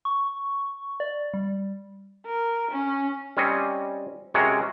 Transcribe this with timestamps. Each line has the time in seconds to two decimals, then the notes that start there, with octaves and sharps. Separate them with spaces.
0.05 C#6
1.00 D5
1.34 G3
2.26 A#4
2.71 C#4
3.37 G3 C4 C#4 D#5
4.34 C3 G#3 C#4 F#4 A#4